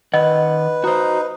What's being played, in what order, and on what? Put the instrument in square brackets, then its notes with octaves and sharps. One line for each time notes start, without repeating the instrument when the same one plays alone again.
[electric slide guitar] D#3 F#5 [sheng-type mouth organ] B4 [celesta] D#5
[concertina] D#4 [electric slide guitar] F#4 C5